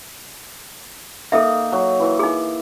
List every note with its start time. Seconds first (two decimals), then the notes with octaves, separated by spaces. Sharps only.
1.32 A#3 D#4 A4 E5
1.72 F#3
2.00 E3
2.19 D#4 G#4